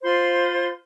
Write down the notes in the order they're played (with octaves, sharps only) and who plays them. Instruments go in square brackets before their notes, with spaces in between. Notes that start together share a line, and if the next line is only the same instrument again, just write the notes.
[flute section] F4 C5 B5 C6